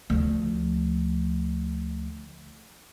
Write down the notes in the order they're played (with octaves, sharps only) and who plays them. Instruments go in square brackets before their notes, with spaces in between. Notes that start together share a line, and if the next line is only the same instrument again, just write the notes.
[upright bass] D2 F3